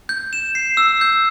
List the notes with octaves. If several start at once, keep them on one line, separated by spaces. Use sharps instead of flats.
G6
E7
C7
E6
G6